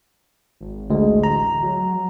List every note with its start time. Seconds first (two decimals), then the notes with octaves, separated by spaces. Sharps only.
0.61 G#1
0.90 A1 D2 G#3
1.24 A#5
1.62 F#3